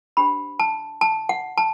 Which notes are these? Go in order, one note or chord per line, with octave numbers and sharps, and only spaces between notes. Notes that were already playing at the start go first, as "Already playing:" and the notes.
D4 G4 C5 B5
A5
A5
F#5
A5